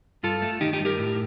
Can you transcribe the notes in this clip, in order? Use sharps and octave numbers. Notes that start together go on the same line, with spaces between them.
G2 F4 A4
A3
D#3 D#4 G4
D#4 G4
G2
G4 A#4
A2